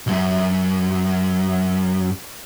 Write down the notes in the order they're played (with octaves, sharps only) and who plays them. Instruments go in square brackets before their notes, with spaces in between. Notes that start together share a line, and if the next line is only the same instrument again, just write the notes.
[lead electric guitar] B1 F#2